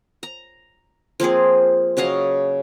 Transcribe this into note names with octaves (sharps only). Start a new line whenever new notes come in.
A#5
F3 A#3 C4 G#4
C#3 F#3 D#5 F5